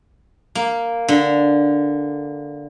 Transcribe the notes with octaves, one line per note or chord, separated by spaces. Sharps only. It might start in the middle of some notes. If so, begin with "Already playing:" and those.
A#3
D3